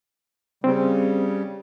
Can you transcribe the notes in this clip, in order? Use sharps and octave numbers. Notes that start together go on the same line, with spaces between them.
C#3 G3 C4